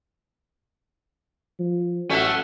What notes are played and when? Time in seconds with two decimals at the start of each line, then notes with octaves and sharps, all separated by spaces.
1.59 F3
2.10 A1 A3 C#4 F#4 E5 F#5